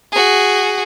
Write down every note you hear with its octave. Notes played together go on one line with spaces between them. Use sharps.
F#4 G#4